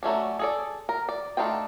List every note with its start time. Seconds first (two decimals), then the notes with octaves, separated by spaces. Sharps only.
0.03 F#3 A3 C#4 D4
0.39 G#4 A4 D5
0.89 A#4
1.09 D5
1.37 A3 D4 D#4 F4 G5